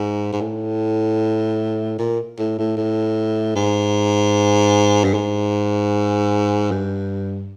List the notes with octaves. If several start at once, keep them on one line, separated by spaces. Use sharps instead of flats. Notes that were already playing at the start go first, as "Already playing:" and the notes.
Already playing: G#2
G#2
A2
A#2
A2
A2
A2
G#2
G2
G#2
G2